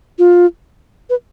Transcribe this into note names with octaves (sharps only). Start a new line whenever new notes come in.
F4
B4